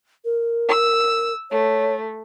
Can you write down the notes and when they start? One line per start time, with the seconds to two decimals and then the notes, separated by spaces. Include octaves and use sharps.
0.25 A#4
0.68 E6
1.51 A3 C#5